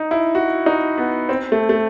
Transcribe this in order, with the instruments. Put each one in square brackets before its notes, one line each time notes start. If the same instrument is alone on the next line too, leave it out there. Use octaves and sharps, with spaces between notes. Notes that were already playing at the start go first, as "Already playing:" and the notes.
Already playing: [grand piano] D#4
E4
F#4
D#4
B3
C4
A3
A3